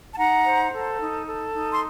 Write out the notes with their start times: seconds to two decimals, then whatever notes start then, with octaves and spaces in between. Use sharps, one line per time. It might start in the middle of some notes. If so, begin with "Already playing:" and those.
0.14 A5
0.18 D#4 F#5 A#5
0.45 C5
0.72 A4
0.99 D#4
1.26 A4
1.54 D#4
1.70 C6